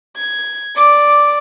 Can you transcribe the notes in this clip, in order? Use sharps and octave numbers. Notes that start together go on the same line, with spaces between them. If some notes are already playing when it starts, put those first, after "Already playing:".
G#6
D5 D6